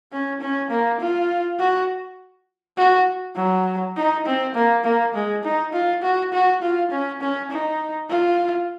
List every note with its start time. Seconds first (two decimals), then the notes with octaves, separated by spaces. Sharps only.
0.12 C#4
0.41 C#4
0.71 A#3
1.01 F4
1.59 F#4
2.77 F#4
3.36 F#3
3.96 D#4
4.26 C4
4.55 A#3
4.84 A#3
5.15 G#3
5.44 D#4
5.73 F4
6.02 F#4
6.33 F#4
6.62 F4
6.91 C#4
7.21 C#4
7.51 D#4
8.10 F4